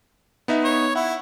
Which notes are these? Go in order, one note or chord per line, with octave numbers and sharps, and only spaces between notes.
B3 D#4 E5
C#5
E4 F#5